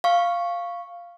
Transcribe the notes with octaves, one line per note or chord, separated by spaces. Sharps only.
F5 C#6